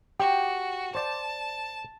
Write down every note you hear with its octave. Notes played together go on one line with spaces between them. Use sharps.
F#4 G4 G5
C5 D5 A5